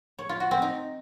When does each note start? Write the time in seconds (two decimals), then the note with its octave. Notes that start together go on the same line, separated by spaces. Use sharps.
0.19 C#5
0.29 F4
0.40 F#4
0.51 C4
0.62 D#4